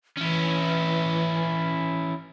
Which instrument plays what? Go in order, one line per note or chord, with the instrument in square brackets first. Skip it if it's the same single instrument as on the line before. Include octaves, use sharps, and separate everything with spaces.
[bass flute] E3 [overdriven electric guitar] C#4 E4